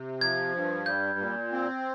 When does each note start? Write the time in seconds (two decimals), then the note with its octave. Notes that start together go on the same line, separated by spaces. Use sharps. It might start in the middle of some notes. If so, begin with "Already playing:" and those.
Already playing: C3
0.21 F3 G#6
0.54 G2
0.86 G3 G6
1.19 A#2
1.52 C4